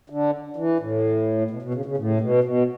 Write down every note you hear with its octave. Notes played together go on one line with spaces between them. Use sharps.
D3
E3
A2
B2
B2
C#3
C#3
A2
B2
B2